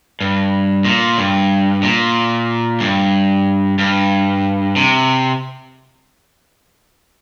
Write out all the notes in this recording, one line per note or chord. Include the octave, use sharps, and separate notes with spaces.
G2
A#2
G2
A#2
G2
G2
C3